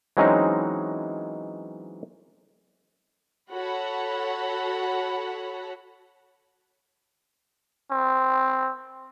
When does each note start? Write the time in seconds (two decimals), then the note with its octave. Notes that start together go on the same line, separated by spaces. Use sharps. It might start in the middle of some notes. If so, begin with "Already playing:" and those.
0.17 E3 F#3 G#3 C4 C#4 D#4
3.52 F#4 A4 C#5 F#5 B5
7.91 C4